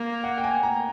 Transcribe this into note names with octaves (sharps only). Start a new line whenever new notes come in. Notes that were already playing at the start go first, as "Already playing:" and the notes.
Already playing: A#3
F#5
G5
G#5
A#5